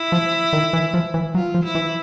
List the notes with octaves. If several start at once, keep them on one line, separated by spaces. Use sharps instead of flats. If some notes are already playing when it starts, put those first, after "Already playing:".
Already playing: E4
F3
D#3
E3
F3
E3
F#3 F4
F3
E4
E3